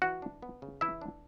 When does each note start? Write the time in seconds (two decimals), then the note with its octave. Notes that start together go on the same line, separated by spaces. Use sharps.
0.02 E3 F#4 F#5
0.22 D4
0.42 B3
0.62 C#3
0.81 E3 E4 E5
1.01 D4